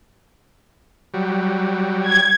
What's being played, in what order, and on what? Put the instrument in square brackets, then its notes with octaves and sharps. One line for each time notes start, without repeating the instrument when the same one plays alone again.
[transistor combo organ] F#3 G3
[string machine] G#6